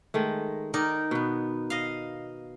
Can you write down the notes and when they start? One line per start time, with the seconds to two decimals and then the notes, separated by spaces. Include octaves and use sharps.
0.14 D#3 G#3 A3
0.74 D#3 D#4 A#4 D5
1.11 B2 B3
1.70 D#5 F5